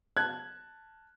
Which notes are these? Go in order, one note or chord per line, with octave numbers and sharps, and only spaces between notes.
A5 F#6 G#6